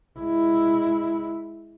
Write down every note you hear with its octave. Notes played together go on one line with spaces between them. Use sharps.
G#3 E4